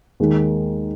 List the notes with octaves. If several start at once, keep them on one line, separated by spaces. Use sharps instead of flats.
D#2 D#3 G#3